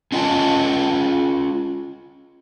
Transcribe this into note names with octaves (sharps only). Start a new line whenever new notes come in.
C#4 F4 D#5 F#5 G#5 A5